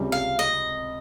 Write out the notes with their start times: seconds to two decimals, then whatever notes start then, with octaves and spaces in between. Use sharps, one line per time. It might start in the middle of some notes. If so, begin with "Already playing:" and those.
Already playing: C#2 C3 G3 C#4
0.12 F5
0.39 D#5